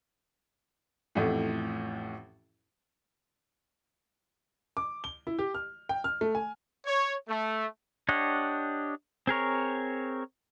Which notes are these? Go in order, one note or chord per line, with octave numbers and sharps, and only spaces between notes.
A1 F2 A2
D6
G7
E4
G4
F6
G5
F6
A3
G#5
C#5
A3
D4 G4 C#5 D#5 F#5
C4 G#4 A#4 C#5